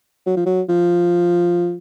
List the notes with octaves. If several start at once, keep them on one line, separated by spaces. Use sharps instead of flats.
F#3
F3
F#3
F3